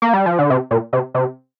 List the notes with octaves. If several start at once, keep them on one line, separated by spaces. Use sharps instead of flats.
A#3
G3
F3
D3
C3
A#2
C3
C3